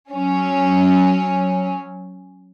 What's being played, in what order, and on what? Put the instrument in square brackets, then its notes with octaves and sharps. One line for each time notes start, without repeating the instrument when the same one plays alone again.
[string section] F#3 C#4